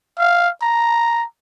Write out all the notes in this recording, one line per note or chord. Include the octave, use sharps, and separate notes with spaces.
F5
A#5